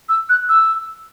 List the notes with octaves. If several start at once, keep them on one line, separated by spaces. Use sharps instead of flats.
E6
F#6
E6